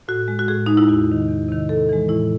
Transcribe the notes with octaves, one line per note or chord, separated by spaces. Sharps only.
A2 F#4
G#3
F#4
A2 G#4
G#3 D#4
E4
E2 F#4
C3 D#3
E2
C3 D#3
A2 A4
E3 G#3
A2 E4